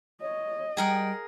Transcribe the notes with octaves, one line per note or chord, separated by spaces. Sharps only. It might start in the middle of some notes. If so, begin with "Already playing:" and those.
C#5 D#5
G3 G#4 A#4 F#5 G5